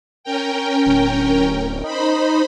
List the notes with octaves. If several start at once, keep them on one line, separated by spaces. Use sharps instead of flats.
C#4 A#4 G5
D1
D#4 C5 B5